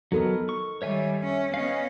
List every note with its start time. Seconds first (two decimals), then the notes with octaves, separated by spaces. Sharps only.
0.12 F#3 B3 D#4 A4 A#4
0.49 C#6
0.82 D#3 G3 C#5 E5 G#5
1.23 C#4
1.54 B3 C#4 D#5 F5